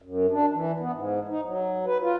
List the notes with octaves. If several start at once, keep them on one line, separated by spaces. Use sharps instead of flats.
F#2
D4
E3
B3
G#2
D#4
F#3
B4
F4